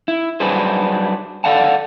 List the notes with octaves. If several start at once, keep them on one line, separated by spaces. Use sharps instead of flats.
E4
F#3 G3 D4 G#4 B4 C5
A4 A#4 D5 F5 F#5 A5